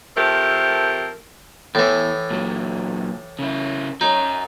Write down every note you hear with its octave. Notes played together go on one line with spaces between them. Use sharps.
F3 A3 C4 G4 A#4
E2 A2 E3
A#2 F#3
C#3 E4
F#3 C#4 D#4